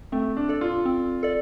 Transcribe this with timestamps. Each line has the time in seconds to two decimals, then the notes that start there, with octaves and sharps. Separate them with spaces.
0.12 A3 C4
0.37 D4
0.49 A4 D5
0.61 F4
0.85 C4
1.23 A4 D5